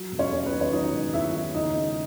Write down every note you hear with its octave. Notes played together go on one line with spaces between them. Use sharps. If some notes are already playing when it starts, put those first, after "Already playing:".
Already playing: F#3
E1
C#4 C#5
E2
B3 B4
D#3
C#5
F#3 D#4 D#5
E1
E2 E4 E5
D#3
C#2 D#4 D#5
C#2